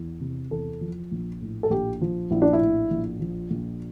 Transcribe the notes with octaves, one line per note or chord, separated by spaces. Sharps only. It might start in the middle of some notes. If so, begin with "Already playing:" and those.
Already playing: E2
C3
E2 A4
F3
A#1
A2
A4
A#1 G4
F3
A#1 E4
D4
E4
A2
A#1
F3
A#1